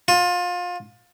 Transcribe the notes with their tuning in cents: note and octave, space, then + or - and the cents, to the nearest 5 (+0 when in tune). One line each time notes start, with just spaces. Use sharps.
F4 +25